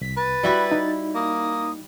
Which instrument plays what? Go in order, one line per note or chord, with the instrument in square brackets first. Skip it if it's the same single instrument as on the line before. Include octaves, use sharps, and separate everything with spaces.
[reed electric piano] C2 [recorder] B6
[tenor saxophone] B4 [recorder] A6
[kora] G3 E4 F#4
[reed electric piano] D#4
[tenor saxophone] A#3 [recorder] D#6